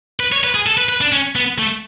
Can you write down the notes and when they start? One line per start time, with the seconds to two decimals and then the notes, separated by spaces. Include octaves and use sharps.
0.20 B4
0.32 C#5
0.44 B4
0.55 G#4
0.66 A4
0.78 B4
0.89 B4
1.01 D4
1.12 C#4
1.36 B3
1.58 A3